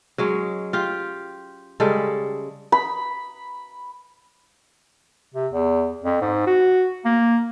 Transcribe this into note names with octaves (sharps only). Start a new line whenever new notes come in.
F#3 G#3 C#4
F4 G4
C#3 G3 G#3 A4
B5
C3
E2
F2
G#2
F#4
A#3